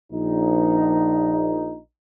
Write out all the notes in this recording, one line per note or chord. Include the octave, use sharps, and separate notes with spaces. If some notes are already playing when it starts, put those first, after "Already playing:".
A#1 D#4